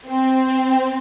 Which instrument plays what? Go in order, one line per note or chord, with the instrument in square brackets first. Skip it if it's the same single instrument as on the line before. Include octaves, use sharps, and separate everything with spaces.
[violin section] C4